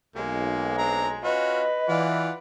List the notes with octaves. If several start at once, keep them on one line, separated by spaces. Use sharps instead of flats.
B1 G#3 A#3
C4 D4 A#5
C#4 F4 F#4 B4 D#5
E3 F4 D5 F#5